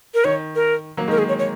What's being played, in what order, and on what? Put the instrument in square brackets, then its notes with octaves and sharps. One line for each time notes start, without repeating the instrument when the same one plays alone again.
[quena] A#4
[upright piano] D#3 [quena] C#5
[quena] A#4
[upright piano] F#3 A#3
[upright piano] D#3 G#3 [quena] A#4
[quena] G#4
C#5
C#5